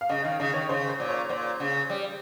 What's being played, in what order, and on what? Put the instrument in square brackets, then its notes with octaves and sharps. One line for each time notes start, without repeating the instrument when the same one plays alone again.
[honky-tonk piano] F5
[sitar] C#3 [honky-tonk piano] D#5
[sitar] D#3 [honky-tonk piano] F5
[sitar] C#3 [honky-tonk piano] D#5
[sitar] D#3 [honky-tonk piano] C#5
[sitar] C#3 [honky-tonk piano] C5
[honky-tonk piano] C5
[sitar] A#2
[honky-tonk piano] C#5
[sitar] A#2 [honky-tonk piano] C5
[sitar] C#3
G3